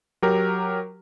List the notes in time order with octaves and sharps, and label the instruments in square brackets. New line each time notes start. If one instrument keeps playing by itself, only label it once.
[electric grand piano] F#3 G4 A#4